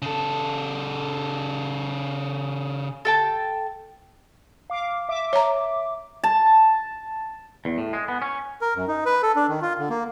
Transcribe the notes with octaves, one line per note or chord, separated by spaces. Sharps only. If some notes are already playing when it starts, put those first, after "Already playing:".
C#3 A4
A4 G5 A5
F5 D6
E5 D6
C#5 A#5
A5
E2
A2
G#3
B3
C#4
A#4
F#2
D#4
B4
A4
D4
D#3
F4
D3
A#3